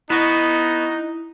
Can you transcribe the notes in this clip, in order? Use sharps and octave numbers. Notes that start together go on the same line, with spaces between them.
B3 D#4 E4 F#4